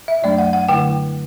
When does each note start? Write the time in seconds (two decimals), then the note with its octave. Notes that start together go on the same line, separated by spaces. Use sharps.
0.08 E5
0.23 F#2 F#3 A3 D4 D5
0.38 F#5
0.53 F#5
0.69 D3 A3 E4 G5